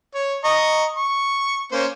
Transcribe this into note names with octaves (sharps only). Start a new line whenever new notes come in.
C#5
D#5 A#5 C#6
C#6
A#3 C#4 C5